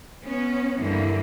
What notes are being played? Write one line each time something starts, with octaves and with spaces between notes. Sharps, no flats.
B3 C#4
G2 D3 E3 A#3